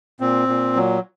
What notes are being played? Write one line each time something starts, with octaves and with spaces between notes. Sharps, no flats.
A#2 C4
A#2
F#3